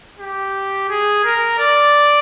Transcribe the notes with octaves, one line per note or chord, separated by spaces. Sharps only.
G4
G#4
A#4
D5